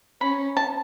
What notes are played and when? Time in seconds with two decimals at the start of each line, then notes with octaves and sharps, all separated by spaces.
0.21 C#4 B5
0.57 A5